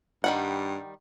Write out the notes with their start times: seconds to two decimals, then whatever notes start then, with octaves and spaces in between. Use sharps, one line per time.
0.24 G2 D#3 G3 F#5